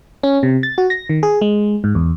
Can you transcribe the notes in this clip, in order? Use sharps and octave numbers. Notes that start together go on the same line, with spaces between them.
C#4
C3
A6
F#4
A#6
D#3
G#4
G#3
G#2
E2